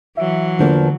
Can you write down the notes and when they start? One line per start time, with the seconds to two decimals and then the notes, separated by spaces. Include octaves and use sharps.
0.17 E3 F#3 E5
0.59 E2 D3 F3 A#3